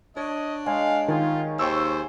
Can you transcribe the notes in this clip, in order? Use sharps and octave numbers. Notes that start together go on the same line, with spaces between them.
D4 C#5 D#5
G#3 G#4 C#5 F5
D#3 F4 G4 G#4 F5
D#2 C5 G5 C#6 E6